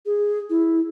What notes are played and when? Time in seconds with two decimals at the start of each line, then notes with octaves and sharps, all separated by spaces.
0.06 G#4
0.50 E4